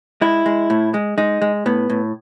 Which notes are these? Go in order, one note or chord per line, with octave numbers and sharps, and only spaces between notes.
G#3 E4
G#3
A2
G#3
G#3 D#4
G#3
A2 B3
A2